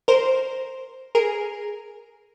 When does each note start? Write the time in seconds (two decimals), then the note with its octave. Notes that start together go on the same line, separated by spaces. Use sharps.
0.08 A#4 C5
1.15 G#4 A#4